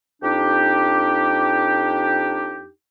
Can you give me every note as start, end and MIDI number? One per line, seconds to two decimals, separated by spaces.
0.23 2.68 41
0.23 2.68 62
0.23 2.68 63
0.23 2.68 67